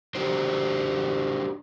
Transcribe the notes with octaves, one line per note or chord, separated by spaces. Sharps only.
D4 F#4 G4 C5